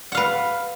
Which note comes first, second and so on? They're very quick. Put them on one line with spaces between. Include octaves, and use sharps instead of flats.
F#5 F5 B4